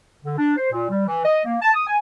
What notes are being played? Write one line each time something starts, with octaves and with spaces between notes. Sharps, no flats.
D3
D4
C5
A#2
G3
E3
D#5
A#3
A5
D#6
G#5